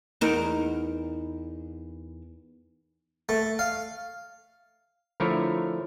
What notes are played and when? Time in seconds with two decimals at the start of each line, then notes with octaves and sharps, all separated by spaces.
0.21 E2 D#4 A#4
3.29 A3
3.59 F5
5.20 D3 F3 A3 E4 A#4 C#5